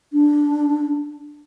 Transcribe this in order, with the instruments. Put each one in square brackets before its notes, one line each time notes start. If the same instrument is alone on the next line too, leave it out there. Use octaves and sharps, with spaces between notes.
[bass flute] D4